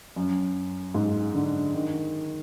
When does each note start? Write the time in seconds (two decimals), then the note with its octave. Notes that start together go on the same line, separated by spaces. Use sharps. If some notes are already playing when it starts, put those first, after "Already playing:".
0.16 F#2
0.94 G#2
1.34 D3
1.75 D#3